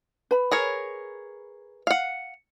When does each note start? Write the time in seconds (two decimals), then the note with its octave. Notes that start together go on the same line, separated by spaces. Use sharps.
0.31 B4 B5
0.51 G#4 A#4 C#5
1.87 F5 F#5